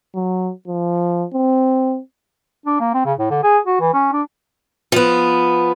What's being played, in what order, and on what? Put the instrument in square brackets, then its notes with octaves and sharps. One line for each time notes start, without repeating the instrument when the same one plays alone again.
[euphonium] F#3
F3
C4
[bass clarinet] D4
A#3
C4
C#3
A2
D3
G#4
F#4
E3
C#4
D4
[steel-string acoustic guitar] F3 B3